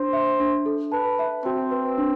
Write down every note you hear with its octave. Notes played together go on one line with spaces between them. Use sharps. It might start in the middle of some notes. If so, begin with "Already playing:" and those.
Already playing: D4 C5
E5
D4
A4
B4 A5
E5
C4 F#4
B4
D4